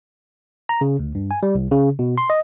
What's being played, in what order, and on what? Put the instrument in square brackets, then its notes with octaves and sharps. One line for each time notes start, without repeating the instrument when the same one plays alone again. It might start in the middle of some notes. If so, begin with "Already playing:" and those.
[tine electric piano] A#5
C#3
D2
G2
G#5
G3
C2
C#3
B2
C6
D#5